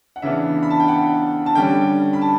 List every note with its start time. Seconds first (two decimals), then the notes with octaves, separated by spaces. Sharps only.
0.16 F#5
0.22 C#3 E3 B3 D4 E5
0.63 B5
0.70 A5
0.80 G5
0.88 F#5
1.46 A5
1.55 D3 G3 C#4 G5
2.13 B5
2.22 A5